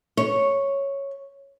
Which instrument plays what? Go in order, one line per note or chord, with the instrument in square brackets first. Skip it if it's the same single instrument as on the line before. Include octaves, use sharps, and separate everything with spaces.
[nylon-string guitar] C#5